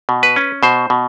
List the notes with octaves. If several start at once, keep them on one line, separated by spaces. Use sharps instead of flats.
B2
B4
C#4
B2 C5
B2